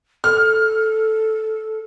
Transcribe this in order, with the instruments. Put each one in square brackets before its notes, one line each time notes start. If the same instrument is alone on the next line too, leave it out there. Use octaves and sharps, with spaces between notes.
[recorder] A4 [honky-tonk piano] F6